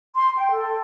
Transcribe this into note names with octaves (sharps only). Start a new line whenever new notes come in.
C6
G5
A4